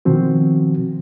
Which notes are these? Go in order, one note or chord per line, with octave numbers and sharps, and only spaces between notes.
B2 D#3 F3 C4 F#4